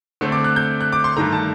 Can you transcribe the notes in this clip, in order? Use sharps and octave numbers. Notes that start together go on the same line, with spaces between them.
D3 A3 C4
D6
F#6
G6
F#6
D6
C6
G2 D#3 A3 A#5
A5